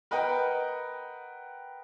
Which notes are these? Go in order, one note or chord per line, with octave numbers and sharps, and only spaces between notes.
A#4 B4 D#5 F#5 G5